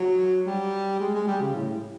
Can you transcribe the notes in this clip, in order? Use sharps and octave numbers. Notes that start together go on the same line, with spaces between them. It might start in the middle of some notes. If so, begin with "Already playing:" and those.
Already playing: F#3
G3
G#3
G#3
G3
C#3
A2